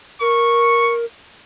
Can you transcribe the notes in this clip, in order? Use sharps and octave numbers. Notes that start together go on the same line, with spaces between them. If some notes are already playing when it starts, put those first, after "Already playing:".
A#4 C#6